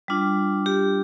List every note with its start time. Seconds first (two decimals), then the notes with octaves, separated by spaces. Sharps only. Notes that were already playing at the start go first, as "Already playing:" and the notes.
0.08 G3 D4 F4
0.66 G4